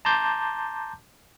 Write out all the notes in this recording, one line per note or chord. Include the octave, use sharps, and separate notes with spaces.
A5 A#5 C6 D6 G6